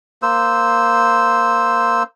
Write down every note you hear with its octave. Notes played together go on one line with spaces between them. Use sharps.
A#3 C5 E6